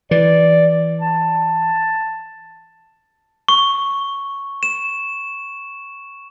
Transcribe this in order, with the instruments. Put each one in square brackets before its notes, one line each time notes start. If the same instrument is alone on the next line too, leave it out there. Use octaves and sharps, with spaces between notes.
[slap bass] E3 [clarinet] D5
[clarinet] A5
[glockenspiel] C#6
E7